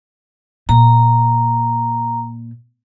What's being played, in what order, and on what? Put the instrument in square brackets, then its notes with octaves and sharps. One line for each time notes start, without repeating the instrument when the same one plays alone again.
[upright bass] A#2 [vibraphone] A#5